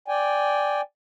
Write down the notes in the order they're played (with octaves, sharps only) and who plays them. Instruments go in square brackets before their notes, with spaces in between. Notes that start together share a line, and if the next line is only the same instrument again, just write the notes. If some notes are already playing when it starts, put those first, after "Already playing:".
[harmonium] D5 G5 G#5